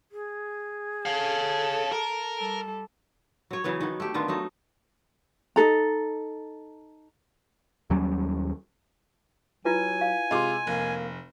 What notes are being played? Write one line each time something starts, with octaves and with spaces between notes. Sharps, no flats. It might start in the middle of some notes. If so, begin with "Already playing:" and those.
G#4
A4 C#5 F5 A5
A#4
G3 A4
F#3 C#5
C#3 E3 F#3 B3
D#3 B3
A3 G4
D3 D#3 B3 F4
F#3 A3 D#4
D#4 G#4 A4 A#5
D#2 F#3 G3 C#4
F#3 E4 F4 B4 G#5
F5
C3 G#3 F4 D#5 C6 D6
F1 A#3